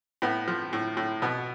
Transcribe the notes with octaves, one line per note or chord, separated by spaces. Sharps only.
A2 B3
F3
A2
A2
B2 B3